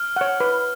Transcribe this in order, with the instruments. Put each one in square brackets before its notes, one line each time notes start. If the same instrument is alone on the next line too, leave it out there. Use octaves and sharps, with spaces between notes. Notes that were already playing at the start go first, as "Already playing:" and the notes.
Already playing: [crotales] F6
[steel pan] C#5 F#5
B4